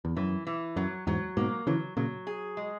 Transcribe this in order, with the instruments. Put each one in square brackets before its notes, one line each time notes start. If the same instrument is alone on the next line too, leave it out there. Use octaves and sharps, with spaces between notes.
[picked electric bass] E2
[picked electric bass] F#2 [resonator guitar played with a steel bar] E3
[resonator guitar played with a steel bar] E3
[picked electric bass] F#2 [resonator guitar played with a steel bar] F#3
[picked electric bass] E2 G#2 [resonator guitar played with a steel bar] F#3
[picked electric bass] G#2 B2 [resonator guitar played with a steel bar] A#3
[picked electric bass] C#3 E3 [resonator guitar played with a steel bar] F#3
[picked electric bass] A#2 C#3 [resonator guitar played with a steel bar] F#3
[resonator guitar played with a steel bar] G#4
G#3